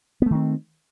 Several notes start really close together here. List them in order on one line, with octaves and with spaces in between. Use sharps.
B3 A3 D#3 C4